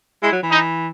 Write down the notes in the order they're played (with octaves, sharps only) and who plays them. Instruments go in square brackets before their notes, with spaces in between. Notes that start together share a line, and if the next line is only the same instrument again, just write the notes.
[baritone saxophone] G#3 [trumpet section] E4
[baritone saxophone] F#3
E3
[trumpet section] D#4